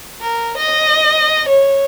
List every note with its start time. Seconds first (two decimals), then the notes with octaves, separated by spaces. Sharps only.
0.21 A#4
0.57 D#5
1.48 C#5